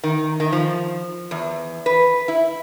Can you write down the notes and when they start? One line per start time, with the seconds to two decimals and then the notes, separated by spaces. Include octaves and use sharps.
0.04 D#3
0.40 D#3
0.52 F3
1.31 E2
1.86 B4
2.28 E4